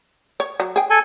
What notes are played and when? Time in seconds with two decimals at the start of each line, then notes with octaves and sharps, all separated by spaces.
0.40 C#5
0.60 F#3
0.76 G#4 G5
0.90 A4 G#5